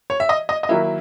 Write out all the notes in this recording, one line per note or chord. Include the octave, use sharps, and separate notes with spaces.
C#5
E5
D#5
D#5
D#5
D#3 F#3 A#3 E4 E5